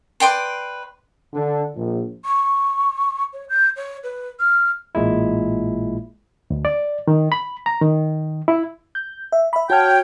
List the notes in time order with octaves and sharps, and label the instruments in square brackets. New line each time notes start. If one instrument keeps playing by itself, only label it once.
[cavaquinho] B4 D5 G5 C6
[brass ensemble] D3
A#1
[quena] C#6
C#5
G6
C#5
B4
F6
[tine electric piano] A1 A#2 G#3 E4
[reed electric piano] D2
D5
D#3
B5
A#5
D#3
E4
[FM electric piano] G6
E5
E5 B5
[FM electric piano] F#4 A5 F6 [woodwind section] C#5 G5